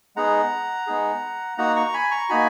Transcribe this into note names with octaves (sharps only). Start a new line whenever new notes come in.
G#3 B3 D#4 G#4 F#5 A#5
G#3 B3 D#4 G#4
A#3 D#4 F#4 F#5 A#5
A#5 C#6
G#5 B5
A#5 C#6
A#3 D#4 F#4 G#5 B5